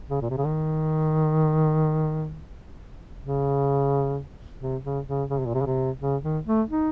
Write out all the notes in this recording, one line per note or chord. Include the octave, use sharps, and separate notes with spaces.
C#3
A#2
C3
C#3
D#3
C#3
C3
C#3
C#3
C#3
C3
A#2
C3
C#3
C3
C#3
D#3
A3
D#4